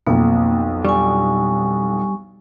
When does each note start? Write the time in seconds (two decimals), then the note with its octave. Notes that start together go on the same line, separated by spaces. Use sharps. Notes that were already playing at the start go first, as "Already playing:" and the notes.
0.07 B1 F2 A#3
0.85 G3 D4 G#5 C#6